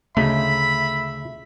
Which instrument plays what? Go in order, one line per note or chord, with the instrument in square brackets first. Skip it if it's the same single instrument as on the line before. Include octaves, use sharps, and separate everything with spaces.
[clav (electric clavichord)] D2 C#3 D#4 [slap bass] A3 [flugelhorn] E5 [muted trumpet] B5